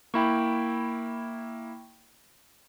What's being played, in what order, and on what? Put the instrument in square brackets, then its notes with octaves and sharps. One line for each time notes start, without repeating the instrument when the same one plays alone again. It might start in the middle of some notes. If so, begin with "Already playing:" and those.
[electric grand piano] A#3 E4 [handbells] G5 B5 C#6